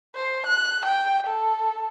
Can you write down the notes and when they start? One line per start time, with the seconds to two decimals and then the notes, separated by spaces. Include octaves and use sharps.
0.15 C5
0.47 F#6
0.86 G5
1.27 A4